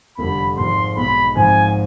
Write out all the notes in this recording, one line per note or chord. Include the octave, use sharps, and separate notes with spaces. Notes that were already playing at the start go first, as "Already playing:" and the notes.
F1 F2 D3 G3 B5
G#1 G#2 F3 C6
B1 B2 G#3 B5
G#1 G#2 F3 C4 G#5